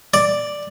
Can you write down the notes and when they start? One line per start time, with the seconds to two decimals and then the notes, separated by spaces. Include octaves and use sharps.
0.14 D5